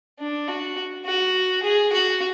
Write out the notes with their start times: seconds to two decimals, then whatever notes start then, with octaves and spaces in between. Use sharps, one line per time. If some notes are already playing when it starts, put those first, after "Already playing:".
0.19 D4
0.48 F#4
1.05 F#4
1.63 G#4
1.93 F#4